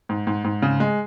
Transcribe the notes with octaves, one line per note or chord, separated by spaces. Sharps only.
G#2
G#2
G#2
C#3
G#3